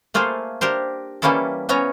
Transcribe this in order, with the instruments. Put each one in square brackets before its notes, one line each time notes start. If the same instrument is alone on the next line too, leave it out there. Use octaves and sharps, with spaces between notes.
[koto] A3 A#3 F4 G#4 A4 C5
D4 G4 A#4 C5
E3 G3 A#3 C#4 E4 A4
E3 B3 C#4 C#5 A#5